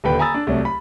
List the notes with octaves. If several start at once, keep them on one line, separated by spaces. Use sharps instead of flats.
D#1 D3 B4 G5 B5
G#5 A#5 B5 D#6 E6 A6
D4
C2 F#3 A3
B5